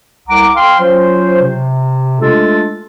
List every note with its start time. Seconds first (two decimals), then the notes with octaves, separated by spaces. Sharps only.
0.28 C2 F#5 A#5 D6
0.55 F5 G5 C6
0.80 F#3 C#4 F4 C5
1.42 C3
2.20 G#3 A3 D4 F4 A4